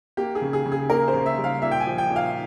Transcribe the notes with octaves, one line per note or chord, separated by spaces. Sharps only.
A#3 G4
G#4
C#3
G#4
C#3
G#4
A#3 A#4
C5
C#3
E5
G3
F5
A#2 E5
G5
G#5
F3
G5
A#2
F5